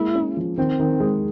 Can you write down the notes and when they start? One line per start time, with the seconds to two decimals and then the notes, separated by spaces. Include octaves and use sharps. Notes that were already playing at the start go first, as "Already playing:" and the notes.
Already playing: G#3 A#3 E4
0.15 C#4
0.37 F3
0.58 D#3 C4
0.79 D#3
1.00 G#3